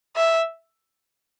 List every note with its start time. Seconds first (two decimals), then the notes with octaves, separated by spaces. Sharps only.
0.16 E5